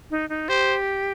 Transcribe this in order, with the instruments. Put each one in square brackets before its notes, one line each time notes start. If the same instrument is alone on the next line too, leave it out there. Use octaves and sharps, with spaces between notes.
[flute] D#4
D#4
[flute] G4 [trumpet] C5